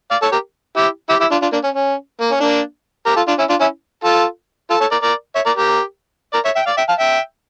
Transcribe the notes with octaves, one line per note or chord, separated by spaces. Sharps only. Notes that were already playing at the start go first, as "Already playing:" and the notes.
D5 F5
A4 C#5
G4 A#4
E4 G4
E4 G4
E4 G4
D4 F4
D4 F4
A#3 D4
C#4
C#4
A#3
C#4
A#3 D4
G4 A#4
F4 A4
D4 F4
C#4 E4
D4 F4
C#4 E4
F4 A4
F4 A4
A4 C#5
A#4 D5
A#4 D5
C#5 E5
A#4 D5
G4 A#4
A#4 D5
C#5 E5
E5 G5
D5 F5
E5 G5
F5 A5
E5 G5